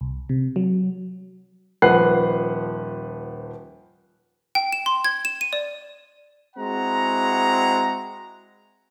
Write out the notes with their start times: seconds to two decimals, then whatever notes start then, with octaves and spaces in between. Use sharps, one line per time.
0.01 C2
0.29 C3
0.56 F#3
1.82 D#1 F3 B4 F#5 F#6 C7
4.55 G5
4.72 E7
4.86 C6
5.05 G#6
5.25 E7
5.41 D#7
5.53 D5
6.56 G#3 C4 E4 F#4 F#5 A#5